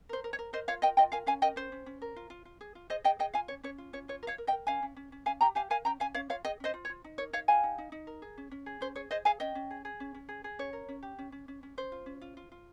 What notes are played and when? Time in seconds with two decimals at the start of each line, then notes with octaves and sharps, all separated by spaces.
0.09 A#4 C5
0.24 A#4
0.33 C#5
0.39 A#4
0.53 A#4 C5 D#5
0.68 F4 C#5 F5
0.82 A#4 D#5 G5
0.97 F4 D#5 G5
1.12 A#4 F5 G#5
1.26 C#4 F5 G#5
1.42 A#4 D#5 G5
1.56 C#4 C5
1.72 C#4
1.86 C#4
2.02 A#4
2.16 F4
2.30 F4
2.45 F4
2.61 G#4
2.75 F4
2.90 G#4 C5 D#5
3.04 G#4 D#5 G5
3.19 G#4 D#5 G5
3.34 F4 F5 G#5
3.48 C#4 C#5
3.63 C#4 C#5
3.78 F4
3.93 C#4 C#5
4.08 F4 C#5
4.23 A#4
4.27 C#5 F5
4.38 A#4
4.47 D#5 G5
4.52 A#4
4.67 C#4 F5 G#5
4.83 C#4
4.96 C#4
5.12 C#4
5.26 C#4 F5 G#5
5.41 G4 G5 A#5
5.55 G4 F5 G#5
5.70 A#4 F5 G#5
5.85 C#4 G5 A#5
6.00 C#4 F5 G#5
6.14 C#4 C#5 F5
6.30 F4 C#5 F5
6.45 G#4 D#5 G5
6.60 C#4 C5 D#5
6.74 F4
6.85 C#5
6.90 F4
7.04 D#4
7.18 A#4 C#5
7.33 D#4 C#5 F5
7.48 G4 F5 G#5
7.63 D#4
7.78 D#4
7.92 D#4
8.07 A#4
8.22 G#4
8.38 C#4
8.51 C#4
8.66 G#4
8.81 C#4 C5
8.96 G#4 C#5
9.11 G#4 C5 D#5
9.25 G#4 F5 G#5
9.40 C#4 D#5 G5
9.55 C#4
9.71 G#4
9.85 G#4
10.00 C#4
10.15 C#4
10.29 G#4
10.44 G#4
10.59 C#4 C#5
10.73 A#4
10.89 C#4
11.03 G4
11.19 C#4
11.32 C#4
11.48 C#4
11.63 C#4
11.77 C#4 C5
11.92 F4
12.06 C#4
12.22 F4
12.37 F4
12.52 F4